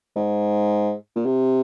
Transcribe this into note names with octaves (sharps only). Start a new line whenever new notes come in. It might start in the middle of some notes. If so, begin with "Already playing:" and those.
G#2
A#2
C3